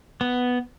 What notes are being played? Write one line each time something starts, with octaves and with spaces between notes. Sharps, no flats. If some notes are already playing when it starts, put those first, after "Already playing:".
B3